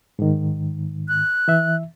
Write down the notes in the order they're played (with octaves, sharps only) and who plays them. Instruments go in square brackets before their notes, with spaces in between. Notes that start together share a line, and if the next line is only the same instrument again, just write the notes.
[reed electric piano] G#2 D#3
[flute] F#6
[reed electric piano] E3 E5